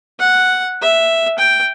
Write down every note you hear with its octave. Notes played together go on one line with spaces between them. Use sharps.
F#5
E5
G5